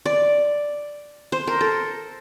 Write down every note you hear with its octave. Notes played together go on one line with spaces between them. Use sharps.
D5
C5
A#4
A4